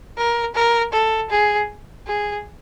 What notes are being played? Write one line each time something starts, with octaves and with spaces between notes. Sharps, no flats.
A#4
A#4
A4
G#4
G#4